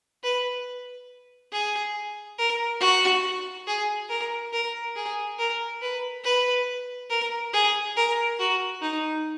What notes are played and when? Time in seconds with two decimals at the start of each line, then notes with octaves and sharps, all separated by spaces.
0.23 B4
1.52 G#4
2.38 A#4
2.81 F#4
3.67 G#4
4.10 A#4
4.53 A#4
4.96 G#4
5.39 A#4
5.82 B4
6.24 B4
7.10 A#4
7.53 G#4
7.97 A#4
8.39 F#4
8.82 D#4